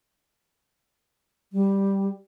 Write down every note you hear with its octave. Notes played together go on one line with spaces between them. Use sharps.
G3